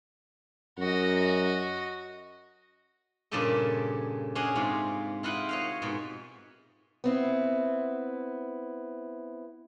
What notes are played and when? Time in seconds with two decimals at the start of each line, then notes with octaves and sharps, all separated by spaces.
0.78 F#2 F#4 D#5
3.31 G2 A#2 C#3 G4 A4 D#5
4.35 C#4 D4 G#4 D#5 F#5 G#5
4.56 G#2 C3 F4
5.23 E4 F4 D#5 F#5 G5
5.49 C#5 D#5 F5
5.82 G#2 B2
7.04 B3 C4 E4